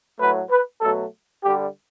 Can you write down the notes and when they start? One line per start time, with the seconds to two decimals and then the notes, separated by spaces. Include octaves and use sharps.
0.19 A2 F#3 A3 B4
0.51 B4
0.81 B2 F#3 A3 A4
1.44 D3 G3 G4